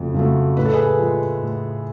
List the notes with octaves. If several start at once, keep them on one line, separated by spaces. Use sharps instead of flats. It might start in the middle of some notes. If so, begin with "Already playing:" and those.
Already playing: F2 C#3 F#3 A3
C#3 F#3 A3
A2 B4
A4
G#4 B4
F3 G#3
A2